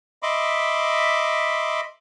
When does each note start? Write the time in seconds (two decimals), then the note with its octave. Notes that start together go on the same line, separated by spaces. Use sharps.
0.23 D#5 E5 B5 C6 D6